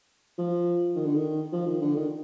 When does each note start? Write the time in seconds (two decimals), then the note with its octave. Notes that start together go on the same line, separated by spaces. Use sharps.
0.38 F3
0.95 D#3
1.05 D3
1.15 D#3
1.52 F3
1.66 D#3
1.81 D3
1.96 D#3